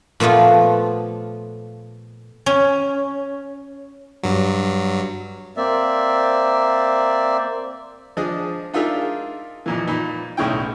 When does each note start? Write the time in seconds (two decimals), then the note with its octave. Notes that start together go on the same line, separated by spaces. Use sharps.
0.20 A#2 F3 A3 B3 F4
2.46 C#4
4.23 G2 F#3
5.57 A#3 C4 D5 E5
8.17 F3 D4 G#4 D#5
8.74 D4 D#4 F4 G#4 A#4 E5
9.66 F2 A#2 E3
9.87 A#2 D#4 B5
10.37 B1 A2 C#3 E4 G5